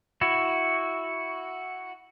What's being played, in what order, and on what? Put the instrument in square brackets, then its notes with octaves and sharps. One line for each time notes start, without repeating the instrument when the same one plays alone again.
[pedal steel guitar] E4 F#4